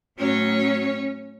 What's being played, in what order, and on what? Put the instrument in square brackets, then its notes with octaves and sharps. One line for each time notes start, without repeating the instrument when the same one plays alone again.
[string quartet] A2 F#3 C#4 C#5